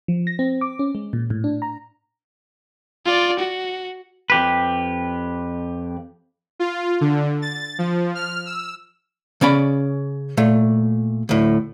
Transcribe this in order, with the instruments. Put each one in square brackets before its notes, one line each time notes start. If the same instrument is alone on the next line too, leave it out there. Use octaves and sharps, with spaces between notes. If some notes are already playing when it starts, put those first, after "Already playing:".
[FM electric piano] F3
A#6
C4
D6
C#4
G#3
A#2
A2
D4
A#5
[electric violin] F4 D5
F#4
[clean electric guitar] F2 G4 B4
[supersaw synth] F4
D3
A6
F3
F6
E6
[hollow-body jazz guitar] C#3 C#4 D5 B5
A#2 A3
D2 A2